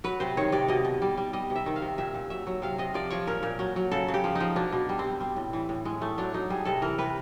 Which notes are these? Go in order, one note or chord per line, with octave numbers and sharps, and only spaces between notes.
F#3 B4
C3 C5
D#3 C#5
C3 D5
B2 D#5
B2
G3 D5
G3
G3 D#5
C3
E5
D#3
F5
C3
A#2 E5
A#2
F#3 E5
F#3
C3 F5
C3 D#5
F3 D5
F3 C#5
A#2 A#4
A#2
F#3
F#3
C#3 A4
C#3
G4
F3
D#4
F3
B2 D4
B2
G3
C4
G3
G3
A2
E3
A2
A2 G#3
A2 A3
F#3 D4
F#3 D#4
G3 G#4
C3 A4
E3 A#4
C3 B4